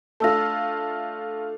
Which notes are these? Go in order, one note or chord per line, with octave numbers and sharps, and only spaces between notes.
A3 D4 F4 A5 E6 A#6